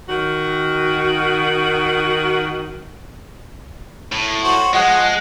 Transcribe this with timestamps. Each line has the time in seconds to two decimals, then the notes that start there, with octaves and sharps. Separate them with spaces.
0.08 D#3 F#4
4.12 A2
4.44 F#4 C5 C#5
4.74 F3 G#3 D#5 F#5